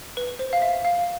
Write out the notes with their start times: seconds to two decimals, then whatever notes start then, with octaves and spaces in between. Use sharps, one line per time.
0.17 B4
0.39 C5
0.53 F5
0.62 E5
0.85 F5